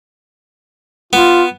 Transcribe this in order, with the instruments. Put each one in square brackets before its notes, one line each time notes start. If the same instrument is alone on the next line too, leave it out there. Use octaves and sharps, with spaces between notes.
[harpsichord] B3 [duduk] F4